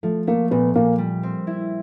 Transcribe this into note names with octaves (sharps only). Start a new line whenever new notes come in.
F3 A3
A3 A#3
A#2 B3
A#2 A#3
G3
C4
E4